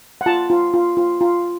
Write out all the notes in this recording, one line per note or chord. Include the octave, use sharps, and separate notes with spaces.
F#5
F4 A5
F4
F4
F4
F4